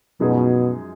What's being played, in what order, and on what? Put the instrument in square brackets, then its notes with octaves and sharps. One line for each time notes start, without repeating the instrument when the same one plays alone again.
[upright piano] F#2 F3 G#3 D#4 G#4 [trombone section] B2